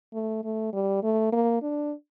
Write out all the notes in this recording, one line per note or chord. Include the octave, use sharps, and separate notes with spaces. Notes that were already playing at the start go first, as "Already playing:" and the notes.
A3
A3
G3
A3
A#3
D4